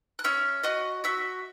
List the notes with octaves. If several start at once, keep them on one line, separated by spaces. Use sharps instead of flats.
F#6
C#4 E5 E6
F#4 D#5 D#6
F#4 E5 E6